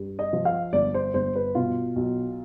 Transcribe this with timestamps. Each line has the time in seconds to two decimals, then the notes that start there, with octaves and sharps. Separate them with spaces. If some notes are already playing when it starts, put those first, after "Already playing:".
Already playing: G2
0.19 D#5
0.33 F3
0.45 F5
0.73 G1 D5
0.94 C5
1.14 G1 C5
1.35 B4
1.55 B2 F4
1.96 B1